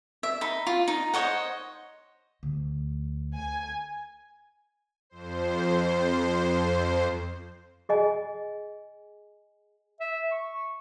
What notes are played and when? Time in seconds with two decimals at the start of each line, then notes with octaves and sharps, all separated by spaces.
0.23 E5
0.41 D#4 B5
0.67 F4
0.88 D#4
1.14 C5 C#5 D#5 F#5
2.43 D2
3.37 G#5
5.10 F2 C5
7.89 G#4 D#5 G#5
10.00 E5
10.32 C#6